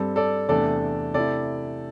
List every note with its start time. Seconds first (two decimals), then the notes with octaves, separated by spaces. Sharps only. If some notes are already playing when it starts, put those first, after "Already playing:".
Already playing: G2 G3 C4 A4
0.16 A4 D5
0.49 E2 C3 A3 D4 A4 D5
1.14 C3 A3 E4 A4 D5